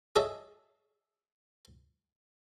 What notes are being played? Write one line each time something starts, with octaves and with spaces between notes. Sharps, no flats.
G#4 A4 C#5 D#5 E5